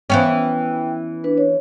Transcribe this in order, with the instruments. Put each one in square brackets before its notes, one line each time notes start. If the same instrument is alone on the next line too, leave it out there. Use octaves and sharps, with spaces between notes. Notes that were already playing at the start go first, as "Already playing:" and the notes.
[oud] E3 B3 C#4 [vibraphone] G5
[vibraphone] D4 B4
C#5